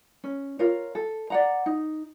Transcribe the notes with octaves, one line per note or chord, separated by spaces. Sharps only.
C#4
F4 A#4 C#5
A4
D5 F#5 A#5
D#4